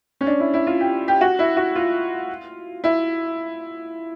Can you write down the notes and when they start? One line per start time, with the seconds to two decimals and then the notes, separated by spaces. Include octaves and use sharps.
0.21 C#4
0.27 D4
0.40 E4
0.54 E4
0.67 F4
0.80 G4
1.08 G4
1.21 F#4
1.39 E4
1.57 F#4
1.75 F4
2.84 E4